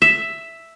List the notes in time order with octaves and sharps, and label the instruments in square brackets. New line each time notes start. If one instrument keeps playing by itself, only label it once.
[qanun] E5